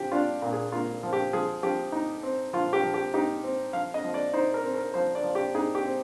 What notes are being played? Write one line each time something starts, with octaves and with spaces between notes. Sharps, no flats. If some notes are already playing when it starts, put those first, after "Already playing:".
Already playing: F3 G4
D4 F4
A#2
G#4
A#3 F4
F3
G4
F3 G#4
F3 G4
D#4
C4
F3 F4
G4
F3
G4
D#4 G4
C4
F3 F5
D#5
F3
D5
D#4 C5
A#4
C4
A#4
F3 C5
D5
F3
G4
D#4 G#4
G4
C4